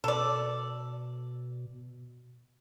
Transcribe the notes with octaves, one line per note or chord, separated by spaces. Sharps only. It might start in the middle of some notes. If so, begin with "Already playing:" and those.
B2 A4 D5